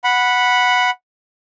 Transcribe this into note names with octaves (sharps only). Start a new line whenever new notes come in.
F#5 B5